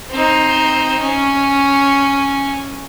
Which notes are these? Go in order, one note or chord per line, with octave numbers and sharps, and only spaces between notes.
C4 D#4
C#4